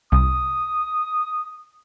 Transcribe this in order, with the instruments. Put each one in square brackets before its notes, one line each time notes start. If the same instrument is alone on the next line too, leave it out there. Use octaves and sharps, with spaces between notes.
[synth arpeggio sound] C2 [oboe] D#6